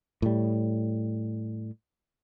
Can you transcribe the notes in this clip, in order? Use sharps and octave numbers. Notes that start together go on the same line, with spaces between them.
A2 G3